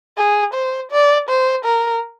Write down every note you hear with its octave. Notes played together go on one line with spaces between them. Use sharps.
G#4
C5
D5
C5
A#4